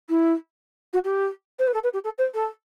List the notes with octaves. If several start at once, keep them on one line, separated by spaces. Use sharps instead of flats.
E4
F#4
G4
C5
B4
A4
B4
G4
A4
C5
A4